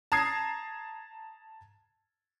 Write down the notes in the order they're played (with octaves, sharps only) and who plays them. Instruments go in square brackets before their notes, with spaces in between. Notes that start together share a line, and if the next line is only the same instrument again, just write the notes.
[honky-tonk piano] A5 A#5 D#6 G#6 C7